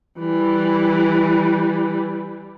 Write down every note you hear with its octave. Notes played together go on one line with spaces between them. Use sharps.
E3 G3